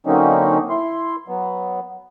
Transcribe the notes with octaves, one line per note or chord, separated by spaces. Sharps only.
D3 F#3 A#3 C4 C#4 D#4
E4 C6
F#3 B3